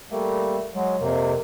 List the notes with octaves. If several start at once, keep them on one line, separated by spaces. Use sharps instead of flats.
G3 A3 A#3
F#3 G#3
F2 C3 A#3